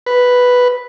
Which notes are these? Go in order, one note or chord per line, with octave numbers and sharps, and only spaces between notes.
B4